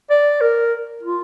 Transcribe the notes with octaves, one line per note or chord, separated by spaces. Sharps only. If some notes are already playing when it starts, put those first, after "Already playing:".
D5
A#4
F4